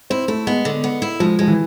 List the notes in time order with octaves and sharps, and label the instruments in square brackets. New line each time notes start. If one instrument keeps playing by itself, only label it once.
[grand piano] C4 [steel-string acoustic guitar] E4
[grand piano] A3 [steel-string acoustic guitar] E4
[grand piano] G#3 [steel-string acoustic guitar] B3
[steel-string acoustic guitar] D3
B3
E4
[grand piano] F3 [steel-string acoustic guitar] G#3
[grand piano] F3 [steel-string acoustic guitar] G#3
[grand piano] E3